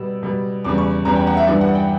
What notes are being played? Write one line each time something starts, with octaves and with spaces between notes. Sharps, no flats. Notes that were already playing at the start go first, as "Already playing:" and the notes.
Already playing: B2 G3 E6
B2 G3
E2 C#3 G3 D6
C#6
E2 C#3 G3 A#5
G5
F#5
E5
G2 E3 G3 D5
F#5
G5